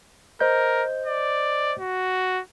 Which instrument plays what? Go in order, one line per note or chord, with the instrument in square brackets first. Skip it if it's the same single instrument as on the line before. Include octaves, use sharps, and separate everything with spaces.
[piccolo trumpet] A#4 [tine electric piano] C5 D#5 G6
[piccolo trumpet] D5
F#4